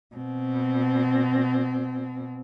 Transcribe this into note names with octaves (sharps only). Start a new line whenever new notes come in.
B2 C4